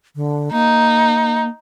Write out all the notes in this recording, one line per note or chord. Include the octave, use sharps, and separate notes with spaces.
D3
A#3 D#4